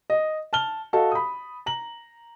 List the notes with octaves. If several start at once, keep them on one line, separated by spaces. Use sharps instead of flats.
D#5
A5 F6 G7
F#4 A4 D#5 F5
B5 D#6
A#5 F#7